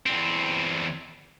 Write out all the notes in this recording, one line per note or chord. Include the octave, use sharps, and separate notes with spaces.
E2 C4